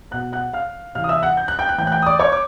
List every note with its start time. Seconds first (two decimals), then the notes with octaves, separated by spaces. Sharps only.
0.11 B2 F#5 F#6
0.33 F#5 F#6
0.53 F5 F6
0.95 C3 E3 F5 F6
1.04 D#6
1.09 E5 E6
1.23 F#5 F#6
1.37 G6
1.48 F#6
1.59 G5 G6
1.69 F#6
1.78 A2 E3 G5 G6
1.87 F#6
1.92 G5 G6
2.02 D#6
2.06 D5 D6
2.19 C#5 C#6
2.32 D6